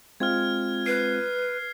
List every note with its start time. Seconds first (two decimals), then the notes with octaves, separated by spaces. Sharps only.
0.20 G#3 C4 F4 F6 G#6
0.86 B4 C7